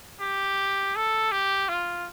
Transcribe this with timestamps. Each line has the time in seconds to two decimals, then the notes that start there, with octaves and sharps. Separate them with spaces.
0.20 G4
0.96 A4
1.32 G4
1.69 F4